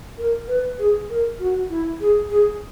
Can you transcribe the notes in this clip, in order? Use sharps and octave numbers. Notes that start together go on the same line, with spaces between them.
A#4
B4
G#4
A#4
F#4
E4
G#4
G#4